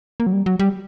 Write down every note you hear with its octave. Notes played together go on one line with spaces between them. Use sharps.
A#3
F#3
G3
F#3
G3